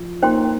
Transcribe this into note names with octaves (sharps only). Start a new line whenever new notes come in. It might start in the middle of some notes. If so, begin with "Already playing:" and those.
Already playing: F3
A#3 D#4 C5 G5 C6